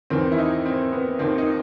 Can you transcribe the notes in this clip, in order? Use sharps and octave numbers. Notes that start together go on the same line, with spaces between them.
E2 D#3 C4
E4
D#4
C4
B3
D#2 D#3 C4
D#4